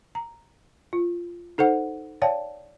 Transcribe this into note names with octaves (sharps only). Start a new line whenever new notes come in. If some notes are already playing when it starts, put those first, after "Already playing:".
A#5
F4
D#4 A4 C5 F#5
C#5 D5 F5 G5 A5